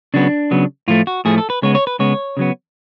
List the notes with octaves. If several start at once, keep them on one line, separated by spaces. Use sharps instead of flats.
C#3 F#3 B3 D4
C#3 F#3 B3
A2 F3 A3 F4
F#4
A2 F3 A3 G#4
A4
B4
C#3 G#3 B3 C#5
C#5
B4
C#3 G#3 B3 C#5
C#3 F#3 B3